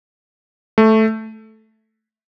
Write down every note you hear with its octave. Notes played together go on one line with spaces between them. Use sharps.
A3